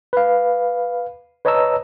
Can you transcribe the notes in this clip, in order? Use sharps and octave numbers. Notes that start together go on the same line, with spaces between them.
B4 F5
B4 C#5 D#5 A5 A#5 E6